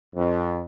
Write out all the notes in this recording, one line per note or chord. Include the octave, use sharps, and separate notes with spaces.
F2